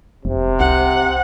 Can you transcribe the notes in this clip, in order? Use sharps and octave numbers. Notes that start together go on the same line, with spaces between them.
F1 C3
C2 F#5